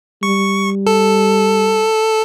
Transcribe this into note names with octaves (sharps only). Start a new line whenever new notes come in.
G3 C#6
A4